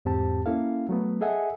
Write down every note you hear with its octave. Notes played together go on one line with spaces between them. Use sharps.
E2 G#2 C4 G4 A5
A#3 C#4 E4 A4 F5
F#3 A3 B3
G#4 A4 D#5 E5 F#5 G#5